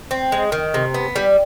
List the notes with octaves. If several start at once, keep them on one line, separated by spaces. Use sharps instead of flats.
C4
G#3
D#3
C3
B3
G3